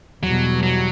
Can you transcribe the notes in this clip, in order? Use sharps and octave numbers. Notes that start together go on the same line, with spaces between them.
E2 B2 F#3 G3
F#3